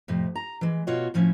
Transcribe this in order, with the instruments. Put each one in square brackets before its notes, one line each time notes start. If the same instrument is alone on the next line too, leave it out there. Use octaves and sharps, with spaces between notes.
[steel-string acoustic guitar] F2 A2 C3
A#5
E3 G#3
B2 F4 F#4 C#5 D#5
A2 F3 C#4 E4